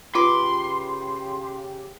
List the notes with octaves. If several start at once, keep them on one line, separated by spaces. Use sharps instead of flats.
C#3 F4 G4 B4 C6 D6